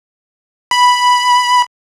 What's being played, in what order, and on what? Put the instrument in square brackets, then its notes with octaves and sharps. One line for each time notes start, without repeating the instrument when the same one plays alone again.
[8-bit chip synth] B5